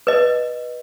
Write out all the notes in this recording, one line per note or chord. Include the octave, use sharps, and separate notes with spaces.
B4 D#5